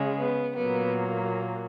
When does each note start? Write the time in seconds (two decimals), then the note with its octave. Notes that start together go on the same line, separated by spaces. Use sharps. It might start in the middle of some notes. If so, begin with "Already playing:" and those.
Already playing: C#3 G#3
0.20 B3
0.57 A#2 F#3 A#3 B3